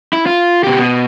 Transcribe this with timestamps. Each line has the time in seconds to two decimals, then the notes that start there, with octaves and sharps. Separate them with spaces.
0.13 E4
0.26 F4
0.64 B2 G4
0.79 B2